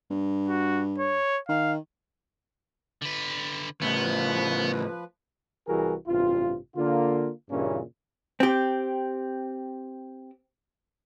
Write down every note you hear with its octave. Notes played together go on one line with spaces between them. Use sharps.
G2
F#4
C#5
D#3 F5
D3 B4
A2 C#3 F3 B3 B4
C2 E3 G3 F#4 G#4 A#4
A1 G2 C3 F4
D3 A#3 F4
G2 A#2 C#3 E3 A#3 C#4
C4 G4